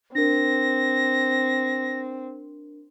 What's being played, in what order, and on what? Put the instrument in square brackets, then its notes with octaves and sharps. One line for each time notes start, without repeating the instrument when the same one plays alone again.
[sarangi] C4 [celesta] D4 A#4 [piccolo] A#6